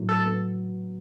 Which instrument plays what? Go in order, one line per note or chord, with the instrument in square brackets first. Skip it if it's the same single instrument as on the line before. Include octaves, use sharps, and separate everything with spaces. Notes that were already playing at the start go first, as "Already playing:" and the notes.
Already playing: [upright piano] A2 F#3
[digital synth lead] A4
[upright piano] B3